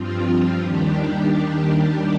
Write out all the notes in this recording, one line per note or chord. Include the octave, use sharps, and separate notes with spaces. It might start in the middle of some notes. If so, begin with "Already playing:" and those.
Already playing: G2 F3 C4 F4
D#2 D#3 G3 D4 G4